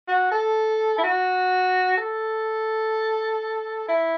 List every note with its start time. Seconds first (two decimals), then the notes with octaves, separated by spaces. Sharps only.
0.08 F#4
0.31 A4
0.98 E4
1.03 F#4
1.97 A4
3.88 E4